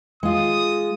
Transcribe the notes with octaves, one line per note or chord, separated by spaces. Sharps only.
G#3 F4 D#6